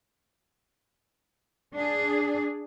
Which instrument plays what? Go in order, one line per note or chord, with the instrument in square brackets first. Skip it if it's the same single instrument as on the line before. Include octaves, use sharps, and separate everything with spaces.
[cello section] D4 G#4